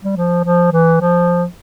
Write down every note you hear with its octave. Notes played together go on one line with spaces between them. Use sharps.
G3
F3
F3
E3
F3